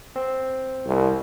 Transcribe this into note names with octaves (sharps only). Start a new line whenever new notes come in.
C4
C2